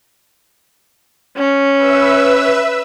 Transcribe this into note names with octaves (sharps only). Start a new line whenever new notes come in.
C#4
B4 E5 E6